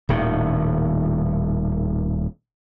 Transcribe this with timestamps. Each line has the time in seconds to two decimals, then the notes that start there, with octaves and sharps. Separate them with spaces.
0.09 D#1 A2 D#3